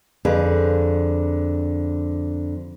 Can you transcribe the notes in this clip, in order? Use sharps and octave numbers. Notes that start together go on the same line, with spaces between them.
F2 D3 G#4 B4